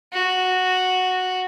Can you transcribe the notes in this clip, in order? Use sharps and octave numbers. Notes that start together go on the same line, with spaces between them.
F#4